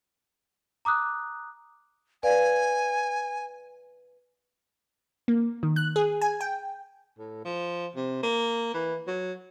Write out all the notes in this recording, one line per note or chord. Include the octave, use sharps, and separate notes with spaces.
A#5 D6 D#6 F#6
B4 D5 F5 G#5
A#3
D#3
F#6
G#4
G#5
G5
A2
F3
C3
A#3
E3
F#3